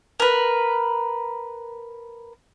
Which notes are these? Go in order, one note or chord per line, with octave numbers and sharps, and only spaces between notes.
A#4 B4